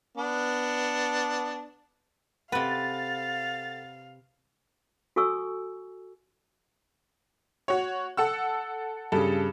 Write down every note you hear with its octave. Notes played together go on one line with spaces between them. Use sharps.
B3 D4
C3 A4 B4 F5 F#5 A6
F#4 A4 G#5 C#6 E6
F#4 C#5
A4 F#5 E6
G2 C#3 A4